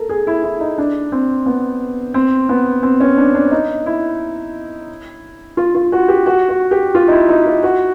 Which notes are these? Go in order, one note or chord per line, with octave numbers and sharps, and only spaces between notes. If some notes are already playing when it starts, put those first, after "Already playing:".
Already playing: A4 A#4
G#4
E4
E4
D#4
D4
C4
B3
C4
B3
C4
C#4
D4
D4
D#4
E4
F4
F4
F#4
G4
F#4
F#4
G4
F4
D#4
E4
D#4
F4
F#4